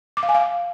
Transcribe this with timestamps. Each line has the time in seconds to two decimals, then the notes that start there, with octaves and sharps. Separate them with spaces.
0.17 D6
0.23 F5
0.29 G#5
0.35 F5